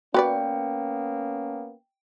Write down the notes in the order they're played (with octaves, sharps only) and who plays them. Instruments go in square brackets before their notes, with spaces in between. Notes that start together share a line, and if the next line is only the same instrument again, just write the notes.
[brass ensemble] A#3 B3 C#4 [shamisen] F#4 B4 D5 [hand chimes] G5